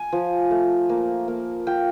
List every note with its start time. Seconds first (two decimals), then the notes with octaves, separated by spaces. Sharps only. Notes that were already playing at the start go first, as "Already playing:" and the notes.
Already playing: G#5
0.12 F3
0.51 A3
0.89 A#3
1.28 A#3
1.67 F4 G5